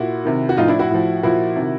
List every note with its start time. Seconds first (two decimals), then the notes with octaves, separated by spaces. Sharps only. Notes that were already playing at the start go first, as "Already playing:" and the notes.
Already playing: A#2 E4 F#4
0.25 C3 D#3
0.49 F#4
0.57 A2 F3 D#4 F4
0.68 D4 E4
0.79 E4 F#4
0.91 A2 F3
1.23 A#2 F3 E4 F#4
1.56 C3 D#3